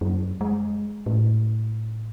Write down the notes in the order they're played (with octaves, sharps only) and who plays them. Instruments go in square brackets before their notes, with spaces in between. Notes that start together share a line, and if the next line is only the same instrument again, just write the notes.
[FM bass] F#2
G#3
A2